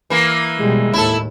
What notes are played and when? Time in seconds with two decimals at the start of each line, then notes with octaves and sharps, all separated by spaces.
0.10 E3 A#3
0.60 B2 G3 G#3
0.93 D#2 A2 E4 A4